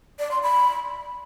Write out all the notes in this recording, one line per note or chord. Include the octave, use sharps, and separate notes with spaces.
D5
C6
B5